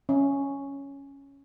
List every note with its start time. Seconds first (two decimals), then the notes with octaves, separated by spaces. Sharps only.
0.09 C#4